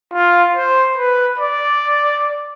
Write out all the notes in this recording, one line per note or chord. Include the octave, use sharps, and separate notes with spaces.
F4
C5
B4
D5